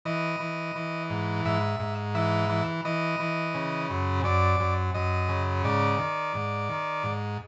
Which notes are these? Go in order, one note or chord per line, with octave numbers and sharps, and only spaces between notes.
E3 D#5
E3
E3
G#2
G#2 E5
G#2
E3 E5
E3
E3 D#5
E3
C#3
F#2
F#2 D5
F#2
F#2 D#5
C#3
G#2 D5
D#3
G#2
D#3
G#2